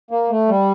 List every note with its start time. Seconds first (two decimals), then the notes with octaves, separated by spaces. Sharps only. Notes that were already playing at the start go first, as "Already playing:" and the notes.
0.11 A#3
0.30 A3
0.49 G3